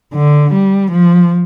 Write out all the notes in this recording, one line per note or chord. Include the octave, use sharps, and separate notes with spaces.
D3
G3
F3